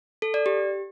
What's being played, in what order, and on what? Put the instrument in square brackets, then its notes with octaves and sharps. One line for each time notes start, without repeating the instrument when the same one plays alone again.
[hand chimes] A4
D5
G4